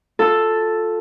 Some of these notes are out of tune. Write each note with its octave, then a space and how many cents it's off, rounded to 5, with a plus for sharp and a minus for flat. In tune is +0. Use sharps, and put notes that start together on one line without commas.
F4 +20 A4 +0